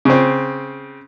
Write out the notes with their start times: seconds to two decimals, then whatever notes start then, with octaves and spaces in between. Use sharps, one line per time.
0.05 C#3 C4